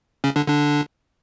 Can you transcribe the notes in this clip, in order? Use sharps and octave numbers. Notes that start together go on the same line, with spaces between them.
C#3 C#4
D3 D4
D3 D4